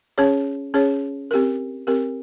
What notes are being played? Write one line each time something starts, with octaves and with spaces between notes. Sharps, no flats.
C#4 G#4 C#5
C#4 G#4 C#5
C4 G4 A#4
C4 G4 A#4